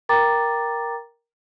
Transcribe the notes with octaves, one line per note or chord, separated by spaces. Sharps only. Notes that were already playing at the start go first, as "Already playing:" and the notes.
A#4 G5 A#5 D6 A6